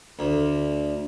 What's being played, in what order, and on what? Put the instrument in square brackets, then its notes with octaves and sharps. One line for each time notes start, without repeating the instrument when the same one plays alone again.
[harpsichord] D2